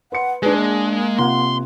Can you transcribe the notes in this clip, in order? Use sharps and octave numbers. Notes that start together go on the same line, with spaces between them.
B4 F#5 C6 C#7
G#3 D4 G#4 B4
A#3
C3 F4 F#5 C6